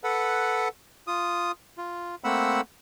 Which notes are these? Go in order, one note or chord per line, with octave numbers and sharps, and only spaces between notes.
A4 B4 F#5
F4 D#6
F4
A3 A#3 C4 F#5 B5 E6